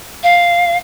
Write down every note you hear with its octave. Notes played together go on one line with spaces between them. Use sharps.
F5